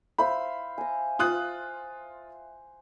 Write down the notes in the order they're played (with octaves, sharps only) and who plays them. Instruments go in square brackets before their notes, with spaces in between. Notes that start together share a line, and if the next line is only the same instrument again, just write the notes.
[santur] C5 E5 F5 [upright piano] B5
[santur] G#5 A#5
[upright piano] F4 D#6 F#6